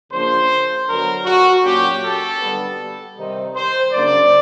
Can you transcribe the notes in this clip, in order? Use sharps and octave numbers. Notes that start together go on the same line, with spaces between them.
C#3 F3 A#3 D4 C5
D3 F#3 B3 A#4
F#4
A#2 F#3 A#3 C#4 G4
A4
D3 G3 B3
C3 D#3 G3 C4 D#4
C5
C#3 F#3 A#3 D4 D5